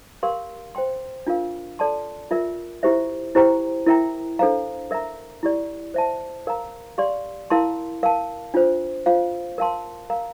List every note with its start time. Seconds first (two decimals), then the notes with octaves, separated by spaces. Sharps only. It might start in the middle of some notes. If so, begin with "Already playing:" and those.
0.23 G4 A#4 F5 C6
0.75 C5 G5 C6
1.26 D4 F4 A#4 F5
1.79 A4 D5 A5 C6
2.31 F4 A#4 E5
2.83 E4 G4 C5 E5
3.35 E4 G4 C5 G5 A#5
3.87 E4 A#4 E5 G5 A#5
4.39 D4 A4 C5 F5 A#5
4.91 A#4 E5 A#5
5.43 E4 G4 D5
5.94 C5 E5 A5
6.47 A#4 F5 A#5
6.98 G4 D5 F5 C6
7.50 E4 A#4 F5 A5 C6
8.03 A#4 F5 A5
8.54 D4 F4 C5
9.06 F4 C5 F5
9.58 A#4 F5 A5 C6
10.10 A#4 F5 A#5